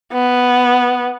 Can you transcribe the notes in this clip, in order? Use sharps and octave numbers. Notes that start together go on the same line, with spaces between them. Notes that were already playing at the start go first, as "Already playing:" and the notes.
B3